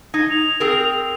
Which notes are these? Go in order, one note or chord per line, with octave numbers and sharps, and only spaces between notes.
D#4 G#6
F7
C4 G#4 A#4